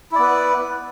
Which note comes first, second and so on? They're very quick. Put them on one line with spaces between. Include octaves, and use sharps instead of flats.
E4 D5 B3 B4